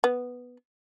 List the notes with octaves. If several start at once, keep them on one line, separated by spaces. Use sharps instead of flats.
B3